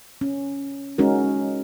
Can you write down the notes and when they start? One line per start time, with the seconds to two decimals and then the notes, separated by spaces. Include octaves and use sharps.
0.21 C#4
0.98 G#3 C#4 D#4 F#4 A#4